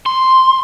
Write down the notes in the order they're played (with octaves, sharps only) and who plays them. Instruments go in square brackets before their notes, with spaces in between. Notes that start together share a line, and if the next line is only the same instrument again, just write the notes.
[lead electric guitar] C6